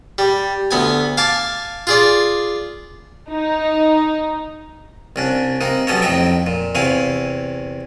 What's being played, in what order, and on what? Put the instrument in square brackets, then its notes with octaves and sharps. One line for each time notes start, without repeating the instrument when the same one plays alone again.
[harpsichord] G3
D2 B3 G#5
F5 G#5 A5 D6
F4 G#4 D5
[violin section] D#4
[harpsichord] C2 C#4 D4
C3 A#3 D#4
F#3 G3 B3 C#4 A4 C#5
F2 A2 D#4 E5 G5
A#2
E2 C3 E4 C#5 F5 G#5